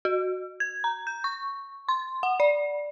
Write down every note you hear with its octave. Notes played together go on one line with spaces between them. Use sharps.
F#4
G#6
A#5
G6
C#6
C6
F#5
D5